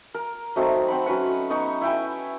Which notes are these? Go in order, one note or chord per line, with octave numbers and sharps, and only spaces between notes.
A#4
F#3 A3 C4 D#4
C4 F#5 B5
F#3 C#4 B4 F#5
B3 D#4 C#6
E4 G5 G#5